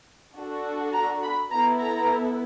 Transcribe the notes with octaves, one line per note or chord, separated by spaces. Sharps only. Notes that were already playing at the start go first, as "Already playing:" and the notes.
D4 F#4 A4
A#5
B5
B3 E4 A4 A#5
A#5